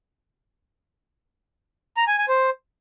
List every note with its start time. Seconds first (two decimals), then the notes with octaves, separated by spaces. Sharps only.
1.97 A#5
2.07 G#5
2.18 G#5
2.28 C5